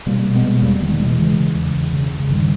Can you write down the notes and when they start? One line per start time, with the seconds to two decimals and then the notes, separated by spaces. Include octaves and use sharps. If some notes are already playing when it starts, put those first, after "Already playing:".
0.06 B2 G3 A#3
0.25 B2
0.35 G#3 B3
0.43 B2
0.62 E2 G3 A#3
0.81 B2 D#3 G3
1.00 B2 E3 G#3
1.19 C#3
1.38 C#3
1.55 E2
1.75 E2
1.93 C#3
2.12 C#3
2.30 G2 D#3 G3